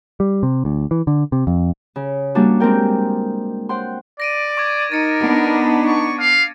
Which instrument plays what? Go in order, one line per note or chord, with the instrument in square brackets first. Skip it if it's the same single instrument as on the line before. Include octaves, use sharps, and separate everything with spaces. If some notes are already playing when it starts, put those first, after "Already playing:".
[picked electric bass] G3
C3
D2
E3
D3
C3
F2
[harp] C#3
G3 A#3 C#4 D4 F#4
G#3 C4 D4 A#4 G5
C5 F#5 G5 C6
[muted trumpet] D5 [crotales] A#6 D7 D#7
[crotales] C#6 D6 G#6
[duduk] D#4 [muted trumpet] A#4 [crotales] A6 C#7 D#7
[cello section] B3 D4
[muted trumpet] C#6
F5